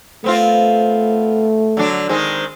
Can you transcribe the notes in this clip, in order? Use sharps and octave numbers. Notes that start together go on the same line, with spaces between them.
A3 B3 C4 F4
D3 F#3 D4
D#3 G#3 C4